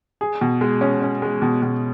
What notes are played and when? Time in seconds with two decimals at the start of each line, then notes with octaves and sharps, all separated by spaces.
0.21 G#4
0.41 B2
0.61 G#3
0.81 C#4
1.01 C#4
1.22 G#3
1.42 B2
1.62 B2